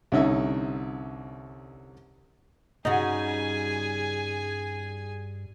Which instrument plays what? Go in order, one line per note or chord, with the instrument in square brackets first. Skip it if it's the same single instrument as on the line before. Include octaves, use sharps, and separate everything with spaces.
[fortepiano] C2 D3 C#4 D#4 E5
[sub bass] G2 [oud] C#3 G3 F#4 [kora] D#4 [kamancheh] G#4 G#5